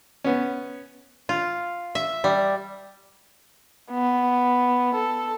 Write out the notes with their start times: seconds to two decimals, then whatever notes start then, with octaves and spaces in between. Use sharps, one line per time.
0.24 B3 C#4
1.29 F4
1.95 E5
2.24 G3
3.91 B3
4.94 A4